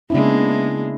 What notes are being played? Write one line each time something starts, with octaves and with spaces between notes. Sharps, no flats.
C#3 G#3 A#3 B3 D4 E4